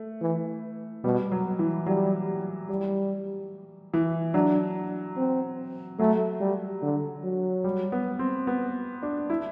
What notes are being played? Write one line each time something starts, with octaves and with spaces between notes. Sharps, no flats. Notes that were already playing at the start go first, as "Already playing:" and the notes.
Already playing: A3
E3
B2 G3
F#3
E3
F#3 G3
G3
E3
F#3 D4
C4
F#3 A3
G3
D3
F#3
G3
B3
C4
B3
D4
E4